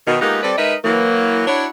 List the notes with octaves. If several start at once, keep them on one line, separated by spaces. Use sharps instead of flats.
B2 D#3
G#3 A#3 B3 D#4 F4 G4
G3 C4 A4 B4 D5
G#3 D#4 A#4 B4 D#5 E5
E3 F#3 A#3
D4 E4 F#4 C#5